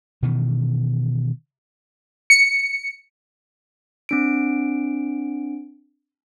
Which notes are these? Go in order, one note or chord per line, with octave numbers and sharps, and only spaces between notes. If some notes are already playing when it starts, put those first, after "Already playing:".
B2 D#3 E3
C#7
C4 D4 D7